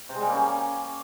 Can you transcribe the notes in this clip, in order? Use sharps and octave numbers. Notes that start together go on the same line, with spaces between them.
C3
G#3
G3
A#3
C#4